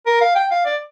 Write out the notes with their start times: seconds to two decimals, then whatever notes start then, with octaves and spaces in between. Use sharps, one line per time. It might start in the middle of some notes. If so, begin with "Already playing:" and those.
0.06 A#4
0.21 F5
0.35 G5
0.51 F5
0.66 D5